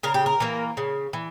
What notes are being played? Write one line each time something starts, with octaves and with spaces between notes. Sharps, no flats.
C#3 A#4
G4
A#4
E3 A#3
C#3
E3